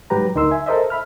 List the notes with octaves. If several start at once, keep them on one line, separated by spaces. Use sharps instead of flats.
G#2 F#3 G4 B4 A#5
D2 D#4 A#4 C6 E6
E5 G#5
A4 A#4 C5 D#5 E5
E5 B5 F6